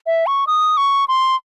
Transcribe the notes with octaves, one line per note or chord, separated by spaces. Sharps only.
E5
C#6
D#6
C#6
C6